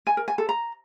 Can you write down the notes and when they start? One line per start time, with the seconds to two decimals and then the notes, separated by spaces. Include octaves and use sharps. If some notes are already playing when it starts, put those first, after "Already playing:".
0.07 G#5
0.17 A#4
0.28 G#5
0.38 A4
0.49 A#5